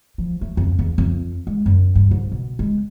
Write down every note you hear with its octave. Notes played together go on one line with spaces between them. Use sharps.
F3
A3
F2
E2
F2
G#3
F#2
G2
G#2
B2
G#3